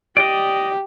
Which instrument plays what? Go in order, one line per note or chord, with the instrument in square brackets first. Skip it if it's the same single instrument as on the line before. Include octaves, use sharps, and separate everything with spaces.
[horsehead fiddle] G4 [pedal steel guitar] D5 D#5